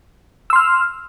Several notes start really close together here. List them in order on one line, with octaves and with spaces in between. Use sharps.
E6 C6 F6